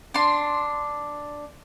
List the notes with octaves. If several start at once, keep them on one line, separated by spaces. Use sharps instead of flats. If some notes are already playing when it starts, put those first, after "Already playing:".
D4 C6